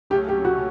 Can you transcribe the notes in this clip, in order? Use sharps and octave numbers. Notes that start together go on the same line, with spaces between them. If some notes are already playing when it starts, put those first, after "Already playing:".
C#2 C#3 F#3 A3 C#4 G4
G4
F#4